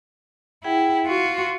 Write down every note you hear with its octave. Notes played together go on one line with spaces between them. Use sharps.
E4 G#4 F#5 G5
F4 F#4 F#5